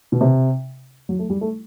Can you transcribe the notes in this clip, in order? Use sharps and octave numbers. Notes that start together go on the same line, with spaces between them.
B2
C3
F#3
A3
G3
A3